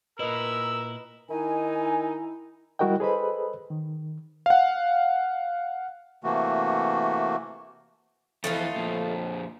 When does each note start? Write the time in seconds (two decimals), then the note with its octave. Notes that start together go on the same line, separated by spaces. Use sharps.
0.19 A#2 E4 A#4 B4 D#5 E6
1.30 D#3 D#4 E4 G#5
2.79 G3 E4 F#4 A#4 D#5 G5
3.00 G#4 A4 B4 C5 D#5 B5
3.70 D#3
4.46 F5 F#5
6.24 C3 E3 A3 A#3 F#4
8.44 F2 E3 A3 D#4 F4
8.76 F2 A#2